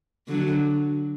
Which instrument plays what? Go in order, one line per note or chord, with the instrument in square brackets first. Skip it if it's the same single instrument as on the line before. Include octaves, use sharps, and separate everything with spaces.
[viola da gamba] D3 F#3